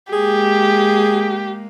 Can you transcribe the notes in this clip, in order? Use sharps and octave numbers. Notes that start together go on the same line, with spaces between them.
G#3 A#3 G4 G#4